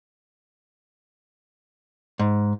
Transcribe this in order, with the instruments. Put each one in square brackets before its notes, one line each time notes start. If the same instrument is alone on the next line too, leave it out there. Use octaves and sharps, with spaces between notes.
[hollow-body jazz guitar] G#2